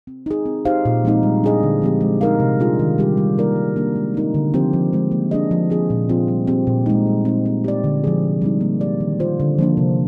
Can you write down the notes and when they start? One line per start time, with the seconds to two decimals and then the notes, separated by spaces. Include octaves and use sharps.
0.07 C4
0.26 D#4 G#4
0.46 C4
0.65 D#4 G4 C5 F5
0.85 A#2
1.04 F3 G#3 C4 D#4
1.23 G3
1.44 D4 G#4 D#5
1.63 D3
1.82 F3 G#3 C4 G4
2.01 G#3
2.21 D#4 A#4 F5
2.40 C3
2.59 G3 D4 F4 G#4
2.79 D#3
2.98 G3 C4 G4
3.17 G3
3.38 A#3 D#4 A#4 D5
3.56 G3
3.76 A#3 D4
3.96 G#3
4.14 C4 D#4 A#4
4.34 D3
4.54 F3 C4 G4 C5
4.73 F3
4.93 G#3 C4
5.11 A#3
5.31 D4 G#4 D#5
5.51 F3
5.70 C4 F4 G#4
5.90 A#2
6.09 F3 C4 F4
6.28 G3
6.47 C4 G4
6.67 A#2
6.86 G#3 D#4
7.07 G3
7.25 C4 D#4
7.45 C4
7.64 G4 D5
7.84 D3
8.04 F3 G#3 D4 G#4
8.23 C3
8.42 G3 C4 D#4
8.61 A#3
8.80 D#4 G4 D5
9.00 D#3
9.20 A#3 F4 C5
9.40 D3
9.59 F3 A#3 D4
9.77 C3